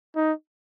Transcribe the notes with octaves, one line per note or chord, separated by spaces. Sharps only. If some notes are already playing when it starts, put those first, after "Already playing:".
D#4